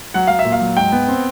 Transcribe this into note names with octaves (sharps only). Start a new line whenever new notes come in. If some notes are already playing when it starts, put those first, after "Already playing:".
F#3 F#5
F#3 F5
E5
A#2
F5
F#3
G#2 G5
B3
C4